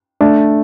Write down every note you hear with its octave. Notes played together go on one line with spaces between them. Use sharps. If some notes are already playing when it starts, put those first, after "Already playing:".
A3 D4